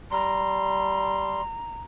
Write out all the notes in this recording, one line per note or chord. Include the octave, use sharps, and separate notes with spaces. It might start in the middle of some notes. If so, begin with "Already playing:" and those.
G3 A#5 C6